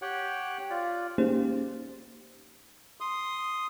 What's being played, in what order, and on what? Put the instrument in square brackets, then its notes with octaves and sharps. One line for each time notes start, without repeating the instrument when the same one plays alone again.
[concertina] G4 C#5 F#5 G5
F4 D5
[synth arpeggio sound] A#3 C#4 D#4 G4 G#4 C5
[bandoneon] C6 D#6